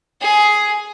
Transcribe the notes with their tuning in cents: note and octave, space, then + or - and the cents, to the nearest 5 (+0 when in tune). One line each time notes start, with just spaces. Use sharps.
G#4 +10